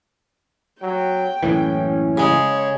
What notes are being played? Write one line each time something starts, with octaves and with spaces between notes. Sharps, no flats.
F#3 G5
F#1 A2 E3 C#4
C#3 G#3 C#5